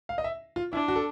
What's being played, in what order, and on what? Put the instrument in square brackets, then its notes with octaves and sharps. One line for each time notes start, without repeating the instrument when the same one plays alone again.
[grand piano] F5
D#5
E5
F4
[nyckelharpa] D4 [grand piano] E4
[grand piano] F#4
A4